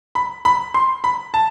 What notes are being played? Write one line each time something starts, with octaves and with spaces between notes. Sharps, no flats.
B5
B5
C6
B5
A5